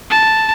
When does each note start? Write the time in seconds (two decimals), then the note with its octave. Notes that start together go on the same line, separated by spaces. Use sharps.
0.10 A5